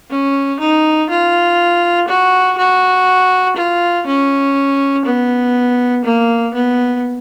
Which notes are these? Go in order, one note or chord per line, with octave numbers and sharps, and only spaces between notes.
C#4
D#4
F4
F#4
F#4
F4
C#4
B3
A#3
B3